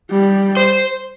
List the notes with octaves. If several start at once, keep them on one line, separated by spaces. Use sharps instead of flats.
G3
C5